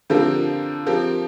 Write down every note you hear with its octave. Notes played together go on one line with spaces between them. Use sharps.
D3 F3 C4 G4 A#4
F3 C4 G4 A#4